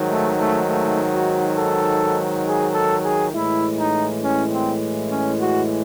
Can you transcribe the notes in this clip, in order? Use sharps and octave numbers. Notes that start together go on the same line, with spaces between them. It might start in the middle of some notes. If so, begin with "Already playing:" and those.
Already playing: G#2 D#3 F#3
A3
A3
A3
F#4
A4
G#4
A4
G#4
A2 E3 G#3 E4
D#4
C#4
C4
C#4
F#4